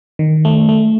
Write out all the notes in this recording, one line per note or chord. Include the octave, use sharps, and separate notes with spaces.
D#3
A3
A3